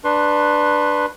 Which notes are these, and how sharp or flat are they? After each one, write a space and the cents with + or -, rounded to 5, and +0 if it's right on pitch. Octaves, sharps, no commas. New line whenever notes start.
D4 +10 B4 +0 C6 +30